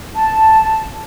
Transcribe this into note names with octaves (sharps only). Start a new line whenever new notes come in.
A5